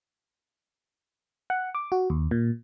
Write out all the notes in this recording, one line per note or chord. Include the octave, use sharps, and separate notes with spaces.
F#5
D6
F#4
D#2
A#2